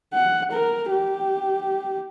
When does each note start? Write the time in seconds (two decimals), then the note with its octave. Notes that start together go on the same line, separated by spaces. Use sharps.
0.14 F#5
0.52 A#4
0.91 G4